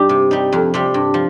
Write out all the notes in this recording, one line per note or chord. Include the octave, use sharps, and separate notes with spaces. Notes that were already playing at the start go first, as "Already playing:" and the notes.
Already playing: G2 G3 D#4 G4
C3
G3 D#4
F2
C3 G3
G2
F3